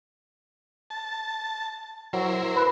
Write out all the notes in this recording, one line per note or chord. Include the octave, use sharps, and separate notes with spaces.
A5
F#3 E4 A#4 C5
B4